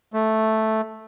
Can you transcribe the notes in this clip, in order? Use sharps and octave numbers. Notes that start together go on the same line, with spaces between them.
A3